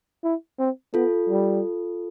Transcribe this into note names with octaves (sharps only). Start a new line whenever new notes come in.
E4
C4
B3 F4 A4
G3